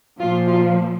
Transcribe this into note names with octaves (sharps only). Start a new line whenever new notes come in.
A#2 F3 F4
F4